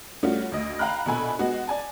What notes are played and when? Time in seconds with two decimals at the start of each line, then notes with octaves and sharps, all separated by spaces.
0.23 G3 A3 C#4 F4 F#4
0.52 D2 D#5
0.79 D#5 F5 G5 A#5 B5 F#6
1.06 A#1 B2 A4 G#5 B5
1.39 G#3 B3 F#4
1.67 D5 G#5 A5